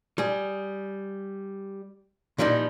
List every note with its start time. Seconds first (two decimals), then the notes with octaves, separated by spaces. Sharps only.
0.18 G3 G#4
2.38 A#2 E3 F3 G3 D#4